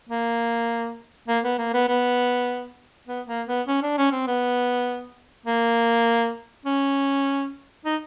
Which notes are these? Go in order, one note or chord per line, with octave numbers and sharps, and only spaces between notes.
A#3
A#3
B3
A#3
B3
B3
B3
A#3
B3
C#4
D4
C#4
C4
B3
A#3
C#4
D#4